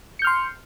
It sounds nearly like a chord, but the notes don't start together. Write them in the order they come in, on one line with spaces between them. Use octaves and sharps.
C#7 G6 F6 C6